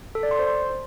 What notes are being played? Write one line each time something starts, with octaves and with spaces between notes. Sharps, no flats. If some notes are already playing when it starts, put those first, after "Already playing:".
A4
D5
C6
C5